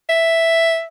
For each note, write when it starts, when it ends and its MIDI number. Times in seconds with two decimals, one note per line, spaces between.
0.09 0.85 76